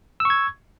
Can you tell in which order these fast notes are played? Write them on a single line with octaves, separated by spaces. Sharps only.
E6 C#6 G#6